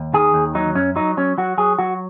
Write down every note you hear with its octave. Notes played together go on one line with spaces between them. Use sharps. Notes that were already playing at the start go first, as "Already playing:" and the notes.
Already playing: D#2
D#3 G#4
D#2
F#3 D#4
F#2 C#4
F#3 D#4
F#3 C#4
F#3 F#4
F#3 G#4
F#3 F#4